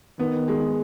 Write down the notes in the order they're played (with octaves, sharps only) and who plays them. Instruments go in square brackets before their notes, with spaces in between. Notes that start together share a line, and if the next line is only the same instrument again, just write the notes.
[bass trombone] D#3 [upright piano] B3
[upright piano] G#3